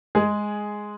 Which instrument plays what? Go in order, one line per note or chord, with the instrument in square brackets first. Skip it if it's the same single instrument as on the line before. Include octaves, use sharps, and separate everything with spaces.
[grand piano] G#3 G#4